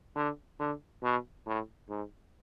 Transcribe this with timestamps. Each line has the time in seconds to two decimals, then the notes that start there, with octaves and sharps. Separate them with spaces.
0.15 D3
0.59 D3
1.03 B2
1.46 A2
1.89 G#2